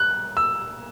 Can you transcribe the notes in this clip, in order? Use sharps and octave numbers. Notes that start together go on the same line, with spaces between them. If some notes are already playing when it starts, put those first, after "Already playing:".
Already playing: F#6
E6